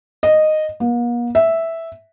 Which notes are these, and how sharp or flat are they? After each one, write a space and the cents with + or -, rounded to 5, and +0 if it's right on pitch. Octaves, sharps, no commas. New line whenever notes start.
D#5 -10
A#3 +45
E5 -5